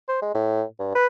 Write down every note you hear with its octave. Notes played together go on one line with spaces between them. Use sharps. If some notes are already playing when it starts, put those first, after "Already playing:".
C5
G#3
A2
G2
B4